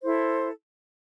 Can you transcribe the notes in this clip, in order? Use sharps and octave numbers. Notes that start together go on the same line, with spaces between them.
E4 A4 C5